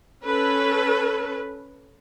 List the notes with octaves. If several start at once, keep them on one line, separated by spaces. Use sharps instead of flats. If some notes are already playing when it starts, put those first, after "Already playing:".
C#4 A4 B4